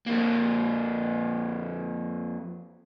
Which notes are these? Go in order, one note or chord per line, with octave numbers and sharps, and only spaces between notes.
F2 A#3